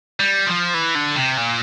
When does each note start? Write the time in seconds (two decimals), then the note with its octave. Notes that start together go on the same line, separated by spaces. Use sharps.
0.20 G3
0.47 F3
0.74 E3
0.95 D3
1.16 C3
1.37 A#2